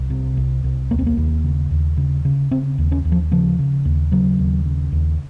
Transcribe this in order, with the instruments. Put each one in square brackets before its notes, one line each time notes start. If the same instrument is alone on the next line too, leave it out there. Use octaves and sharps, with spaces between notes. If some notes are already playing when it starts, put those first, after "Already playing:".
Already playing: [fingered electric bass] C2
C3
C2
C2
D#2 A#3
C4
A#3
D#2
C#3
D#2
C#3
C#3
C#3 C4
D#2
C#4
D#2
F3
C#3 F3
C#3
D#2
C#3 F#3
D#2
C#3
D#2